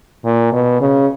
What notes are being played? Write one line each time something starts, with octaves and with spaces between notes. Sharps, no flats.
A#2
B2
C#3